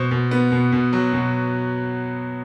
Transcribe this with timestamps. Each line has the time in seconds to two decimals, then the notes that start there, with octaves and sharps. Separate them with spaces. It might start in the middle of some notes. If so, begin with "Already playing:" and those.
Already playing: B2 C5
0.11 B2
0.31 B3
0.52 B2
0.72 B2
0.93 F#3
1.13 B2